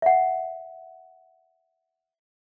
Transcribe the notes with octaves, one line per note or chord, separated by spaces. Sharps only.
E5 F#5